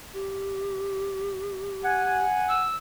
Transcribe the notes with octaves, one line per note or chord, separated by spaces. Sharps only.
G4
F#5 G#5
E6